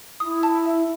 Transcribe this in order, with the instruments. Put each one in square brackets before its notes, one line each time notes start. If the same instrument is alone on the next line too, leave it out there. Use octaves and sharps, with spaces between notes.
[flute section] E4 [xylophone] D#6
[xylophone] A5
E5